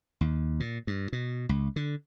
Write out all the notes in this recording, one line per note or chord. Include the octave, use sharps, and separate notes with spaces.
D#2
A#2
G2
B2
C#2
D3